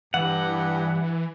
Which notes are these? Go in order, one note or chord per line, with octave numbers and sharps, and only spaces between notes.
G2 E3 F#5